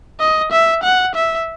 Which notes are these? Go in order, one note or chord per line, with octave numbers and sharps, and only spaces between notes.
D#5
E5
F#5
E5